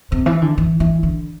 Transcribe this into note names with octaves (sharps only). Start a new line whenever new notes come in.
C3
E3
D3
E3
E3
D3